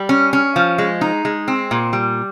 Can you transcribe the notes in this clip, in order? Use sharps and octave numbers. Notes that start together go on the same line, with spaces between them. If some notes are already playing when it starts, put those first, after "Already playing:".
Already playing: G3
C#4
C#4
F3
G#3
D#4
G#3
C4
A#2
G3